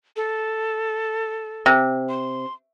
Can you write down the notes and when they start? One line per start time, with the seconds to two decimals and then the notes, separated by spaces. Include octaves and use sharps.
0.16 A4
1.66 C3
2.09 C6